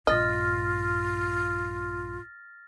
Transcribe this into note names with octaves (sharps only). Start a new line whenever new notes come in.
A#1 G2 F4 D#5 F6 A6 A#6